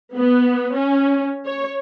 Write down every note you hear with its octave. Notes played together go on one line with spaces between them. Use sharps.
B3
C#4
C#5